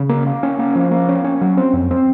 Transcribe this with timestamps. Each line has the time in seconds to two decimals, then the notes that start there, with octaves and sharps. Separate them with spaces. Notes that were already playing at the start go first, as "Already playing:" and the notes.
Already playing: C#3
0.09 A#3
0.26 A#3
0.43 C#4
0.59 A#3
0.75 F3
0.91 A#3
1.09 C#4
1.24 C#4
1.41 F#3
1.57 C4
1.73 F2
1.91 C4